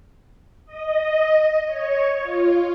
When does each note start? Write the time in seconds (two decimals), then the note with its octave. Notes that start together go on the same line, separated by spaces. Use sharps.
0.66 D#5
1.65 C#5
2.21 F4